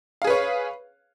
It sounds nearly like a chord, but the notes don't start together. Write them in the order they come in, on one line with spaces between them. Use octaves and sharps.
F5 G#4 B4 C#5